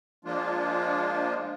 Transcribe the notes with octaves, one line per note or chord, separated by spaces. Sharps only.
F3 G#3 A#3 D4 F4